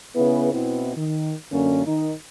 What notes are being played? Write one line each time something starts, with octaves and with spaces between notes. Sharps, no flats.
C#3 B3 E4 G#4 B4
B2 B3 C4 E4
D#3
F#2 D3 A#3 C#4
D#3 D#4